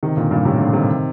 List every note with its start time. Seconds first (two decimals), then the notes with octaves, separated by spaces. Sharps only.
0.03 C3 D#3
0.17 A#2 D3
0.31 G2 A#2
0.45 A2 C3
0.58 A#2 D3
0.73 C3 D#3